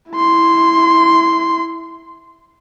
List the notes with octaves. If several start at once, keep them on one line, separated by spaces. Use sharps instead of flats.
E4 C6